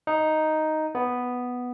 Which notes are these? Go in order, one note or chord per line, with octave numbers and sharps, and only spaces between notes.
D#4
B3